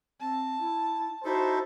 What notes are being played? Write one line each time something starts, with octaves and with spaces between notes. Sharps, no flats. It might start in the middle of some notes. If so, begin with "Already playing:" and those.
C4 A5
E4
D#4 E4 F#4 A4 C5